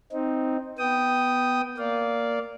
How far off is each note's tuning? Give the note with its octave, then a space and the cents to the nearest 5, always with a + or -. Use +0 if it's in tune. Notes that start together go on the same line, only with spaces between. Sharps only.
C4 +0 D#4 +0
B3 +0 G5 -10 D#6 +0
A#3 +0 D5 -15 F5 +0